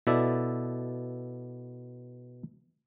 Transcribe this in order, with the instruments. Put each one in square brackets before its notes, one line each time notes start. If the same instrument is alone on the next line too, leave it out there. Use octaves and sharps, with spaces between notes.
[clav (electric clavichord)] B2 E4 A4 D5 E5